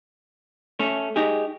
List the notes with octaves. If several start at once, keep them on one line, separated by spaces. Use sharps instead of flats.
A3 C#4 A4
D#4 G4 G#4